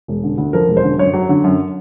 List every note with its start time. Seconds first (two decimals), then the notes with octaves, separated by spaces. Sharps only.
0.08 E1
0.24 D3
0.38 D2
0.53 F3 A#4
0.68 E1
0.77 C5
0.83 D3
0.98 F#2 C#5
1.14 F#3
1.29 D3
1.44 F#2